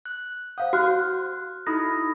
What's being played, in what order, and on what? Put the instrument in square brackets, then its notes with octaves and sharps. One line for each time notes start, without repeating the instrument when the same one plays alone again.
[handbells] F#6
[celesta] C5 F5 F#5 [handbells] D#6 G6
[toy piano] F#4 [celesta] C6 F6 F#6
[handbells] D#4 E4 A4 [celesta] B5 D#6 A#6